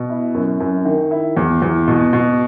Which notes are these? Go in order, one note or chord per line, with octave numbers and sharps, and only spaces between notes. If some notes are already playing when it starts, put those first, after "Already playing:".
Already playing: B2
E4
F#2
F#2
D#3
E4
E2
E2
B2
B2